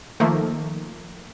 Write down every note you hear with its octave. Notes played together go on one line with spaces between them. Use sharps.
D#3 F3 A3 A#3